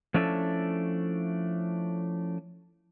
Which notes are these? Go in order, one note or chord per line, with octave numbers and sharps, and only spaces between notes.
F3 A3 C#4 D4 E4 A4